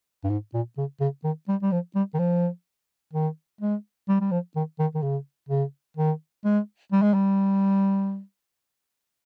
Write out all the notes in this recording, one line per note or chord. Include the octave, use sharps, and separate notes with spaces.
G2
G#2
A#2
C#3
C#3
D#3
G3
G3
F3
G3
D#3
F3
D#3
G#3
G3
G3
F3
D#3
D#3
D#3
C#3
C#3
D#3
G#3
G3
G#3
G3